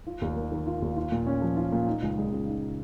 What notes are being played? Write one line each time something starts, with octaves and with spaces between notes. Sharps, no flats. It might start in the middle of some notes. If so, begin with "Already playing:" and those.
F4
D#2
A#3
D#3
F4
D#2
F4
A#2
C#4
F3
F4
A#2
D#4
C#2
G#3
C#3
D#4